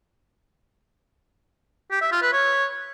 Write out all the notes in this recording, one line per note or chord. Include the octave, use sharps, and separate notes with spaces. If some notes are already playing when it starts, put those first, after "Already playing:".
G4
E5
F4
B4
C#5